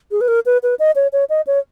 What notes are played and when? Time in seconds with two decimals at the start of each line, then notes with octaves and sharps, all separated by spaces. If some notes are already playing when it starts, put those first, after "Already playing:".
0.11 G#4
0.21 B4
0.28 A#4
0.46 B4
0.63 B4
0.79 D#5
0.96 C#5
1.13 C#5
1.29 D#5
1.47 C#5